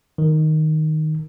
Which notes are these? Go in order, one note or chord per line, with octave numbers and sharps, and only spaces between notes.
D#3